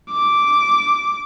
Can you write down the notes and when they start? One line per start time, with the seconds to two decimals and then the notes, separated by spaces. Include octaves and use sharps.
0.11 D6